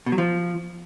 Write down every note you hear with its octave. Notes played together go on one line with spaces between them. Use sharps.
B2
F#3
F3